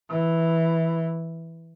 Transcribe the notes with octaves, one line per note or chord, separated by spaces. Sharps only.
E3